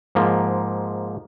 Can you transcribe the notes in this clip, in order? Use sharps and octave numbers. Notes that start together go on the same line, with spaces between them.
G#2 F3 A#3